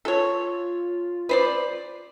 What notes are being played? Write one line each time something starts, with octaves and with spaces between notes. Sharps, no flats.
F4 A4 C#5
B4 C5 D5